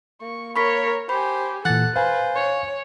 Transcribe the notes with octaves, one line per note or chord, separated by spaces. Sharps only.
A#3 C#6
A#4 C#5 B5 C#6 B6
G4 C5 G#5 B5
A#2 E3 A4 F#5 F#6 A6
B4 C5 F5 G#5
C#5